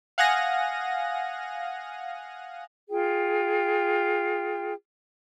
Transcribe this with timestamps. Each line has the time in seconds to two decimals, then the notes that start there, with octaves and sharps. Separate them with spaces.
0.18 F5 F#5 G#5 D#6 A#6
2.90 F4 G#4 G5